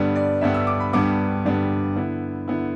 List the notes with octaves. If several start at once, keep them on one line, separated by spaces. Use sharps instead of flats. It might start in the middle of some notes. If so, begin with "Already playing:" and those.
Already playing: G2 D3 G3 B3 D4
D5
G2 D3 G3 B3 D4 E5
E6
D6
B5
G2 D3 G3 B3 D4 D6
G2 D3 G3 B3 D4
D3 B3 E4
D3 B3 E4